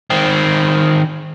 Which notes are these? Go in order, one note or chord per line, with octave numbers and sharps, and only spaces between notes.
D#3 C4